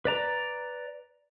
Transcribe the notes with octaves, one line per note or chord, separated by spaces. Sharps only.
B4 D5 A#5